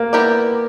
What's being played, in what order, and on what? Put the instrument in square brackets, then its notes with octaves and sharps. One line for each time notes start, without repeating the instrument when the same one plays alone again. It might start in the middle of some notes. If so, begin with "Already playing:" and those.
Already playing: [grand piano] A#3
[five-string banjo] B3 E4 G4 A#4 D5